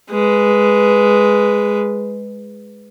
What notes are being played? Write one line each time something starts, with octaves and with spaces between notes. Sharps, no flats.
G#3 B4